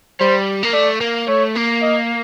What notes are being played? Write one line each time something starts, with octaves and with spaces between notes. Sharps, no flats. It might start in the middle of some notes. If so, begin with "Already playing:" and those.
G3 C5
A#3
A3 D5
A#3
A3 C#5
A#3
D#5